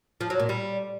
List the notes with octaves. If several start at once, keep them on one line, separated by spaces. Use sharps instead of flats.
F3
F#3
A#2
G3